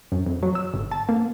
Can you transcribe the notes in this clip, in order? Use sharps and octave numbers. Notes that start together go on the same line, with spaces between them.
F#2
F2
F#3
E6
G1
A5
A#3